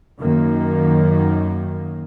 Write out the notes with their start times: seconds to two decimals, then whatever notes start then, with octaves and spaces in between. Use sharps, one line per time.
0.19 F#2 D#3 A#3